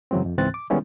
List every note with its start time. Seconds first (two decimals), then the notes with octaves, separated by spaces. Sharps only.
0.11 F#2 C#3 E3 F#3 G#3 C4
0.25 F2
0.38 C#2 G#2 E3 C4 F#6 A6
0.54 D6
0.70 D#3 G3 G#3 B3 C#4 E4